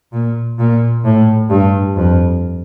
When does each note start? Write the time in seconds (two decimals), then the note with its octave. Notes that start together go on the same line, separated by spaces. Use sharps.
0.12 A#2
0.58 A#2
1.04 A2
1.50 G2
1.96 F2